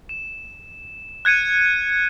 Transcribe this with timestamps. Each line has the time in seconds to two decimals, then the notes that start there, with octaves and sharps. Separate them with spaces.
0.09 E7
1.25 F#6 G#6 C#7 D#7